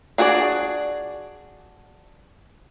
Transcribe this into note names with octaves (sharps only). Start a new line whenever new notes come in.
D4 F#4 G#4 C#5 D5